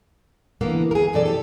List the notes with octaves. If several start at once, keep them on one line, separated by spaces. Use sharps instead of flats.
D3 E3 A#3 B3
G#4 A#4
F#2 B2 E3 A4 D5
G4 A4